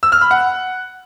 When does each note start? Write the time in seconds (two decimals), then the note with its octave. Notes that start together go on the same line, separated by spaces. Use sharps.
0.03 E6
0.12 F6
0.21 B5
0.31 F#5